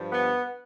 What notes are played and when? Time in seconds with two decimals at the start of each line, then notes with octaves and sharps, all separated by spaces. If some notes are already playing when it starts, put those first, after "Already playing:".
Already playing: G2 F3
0.12 B3